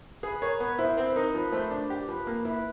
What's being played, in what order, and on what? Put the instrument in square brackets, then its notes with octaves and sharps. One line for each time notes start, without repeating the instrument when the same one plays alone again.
[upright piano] G#4 [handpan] B4
[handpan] A#4 [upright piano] C#5
[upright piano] B3 [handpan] B4
[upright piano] E4 [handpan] C5
[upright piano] C4 [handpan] B4
[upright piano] D#4 [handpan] A#4
[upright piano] F3 [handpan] B4
[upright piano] A3 [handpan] C5
[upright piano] D4
G4
[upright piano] F3 [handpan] B4
[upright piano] A#3
[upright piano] E4 [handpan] B4